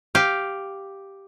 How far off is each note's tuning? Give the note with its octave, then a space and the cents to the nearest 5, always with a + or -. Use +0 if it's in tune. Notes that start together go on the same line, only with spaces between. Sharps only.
G4 +0 F5 +0